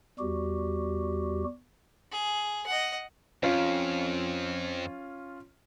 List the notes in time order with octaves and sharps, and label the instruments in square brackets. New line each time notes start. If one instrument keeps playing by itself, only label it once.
[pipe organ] E2 G3 F#4 G4
[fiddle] G#4
D#5 F#5
[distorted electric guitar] F2 [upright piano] C#4 F4